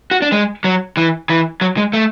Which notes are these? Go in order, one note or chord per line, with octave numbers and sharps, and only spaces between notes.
F#4
D4
G#3
F#3
E3
E3
F#3
G#3
A3